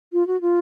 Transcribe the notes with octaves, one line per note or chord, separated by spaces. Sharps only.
F4
F#4
F4